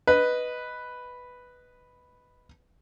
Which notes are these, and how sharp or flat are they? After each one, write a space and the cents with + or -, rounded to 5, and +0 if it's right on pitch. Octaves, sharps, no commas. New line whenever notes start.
B4 +0 D#5 +0